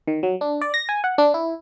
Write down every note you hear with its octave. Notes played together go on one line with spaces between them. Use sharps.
D#3
F#3
D4
D5
A#6
G#5
F#5
D4
E4